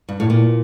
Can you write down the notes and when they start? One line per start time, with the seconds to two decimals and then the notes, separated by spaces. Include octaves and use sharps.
0.09 G2
0.20 A2
0.30 A#2